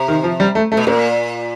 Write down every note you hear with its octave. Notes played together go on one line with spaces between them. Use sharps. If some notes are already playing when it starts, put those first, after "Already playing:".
Already playing: C3
D#3
F3
G3
A3
A3
B2
A#2 A#3